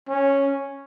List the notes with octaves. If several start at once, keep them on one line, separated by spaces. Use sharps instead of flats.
C#4